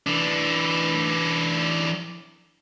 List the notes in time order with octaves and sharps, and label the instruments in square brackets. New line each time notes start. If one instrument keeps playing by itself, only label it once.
[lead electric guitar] E3 D4